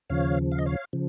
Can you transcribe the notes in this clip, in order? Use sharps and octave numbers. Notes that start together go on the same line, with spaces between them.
D#2 C#3 F3 C#5 F5
F5
D#5
C#5 F5
C#3 F3